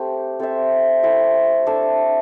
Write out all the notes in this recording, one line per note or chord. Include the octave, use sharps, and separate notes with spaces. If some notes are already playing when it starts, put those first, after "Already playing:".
Already playing: A3 C4 G4
C4 A4 C5 E5
A3 E4 C5 E5
D4 A4 E5